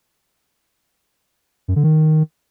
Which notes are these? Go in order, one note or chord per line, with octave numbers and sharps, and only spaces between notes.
F#2
D3
D#3